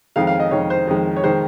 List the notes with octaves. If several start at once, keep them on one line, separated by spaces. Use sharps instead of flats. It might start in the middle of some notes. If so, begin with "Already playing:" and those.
F2 D#3 G#3 F5
F5
D#5
F2 D#3 G#3 C#5
C5
F2 D#3 G#3
C#5
D#3 G#3 C5